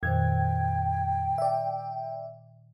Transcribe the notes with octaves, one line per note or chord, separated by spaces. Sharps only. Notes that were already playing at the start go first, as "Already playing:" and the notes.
F2 A#2 D#3 C5 G5 G#6
D5 E5